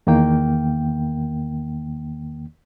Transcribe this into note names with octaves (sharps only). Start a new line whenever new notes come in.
E2 D#3 A#3 G5